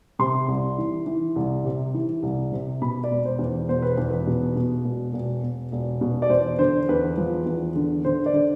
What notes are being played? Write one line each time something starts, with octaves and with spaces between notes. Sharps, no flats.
C3 C6
C2
E3
E3
C2
C3
E3
C2
C3
B2 B5
D5
E1
C5
E2
E1 C5
B4
E2
B4
B2
B2
E1
E1
E1
E1
B2
D5
E2 C5
D3 C5
E2 B4
F3
E2
D3
D3 C5
D5
D3